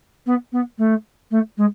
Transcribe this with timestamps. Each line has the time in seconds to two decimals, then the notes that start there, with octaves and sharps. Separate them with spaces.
0.26 B3
0.52 B3
0.78 A3
1.31 A3
1.57 G#3